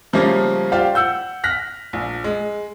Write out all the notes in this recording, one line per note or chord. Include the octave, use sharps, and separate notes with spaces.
C#3 F3 G3 A3 A#3 C#4
F4 G4 C5 D5 F5
F#5 E6 G6
F6 F#6 A#6 B6
A#1
G#3